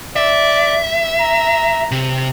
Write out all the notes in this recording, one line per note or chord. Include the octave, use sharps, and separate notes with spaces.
D5 E5
A#5
C3